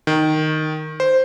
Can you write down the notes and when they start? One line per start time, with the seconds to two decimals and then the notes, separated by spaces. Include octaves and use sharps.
0.07 D#3
1.00 C5